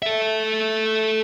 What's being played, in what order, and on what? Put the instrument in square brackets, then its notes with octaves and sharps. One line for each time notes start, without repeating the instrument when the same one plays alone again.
[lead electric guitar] A4 E5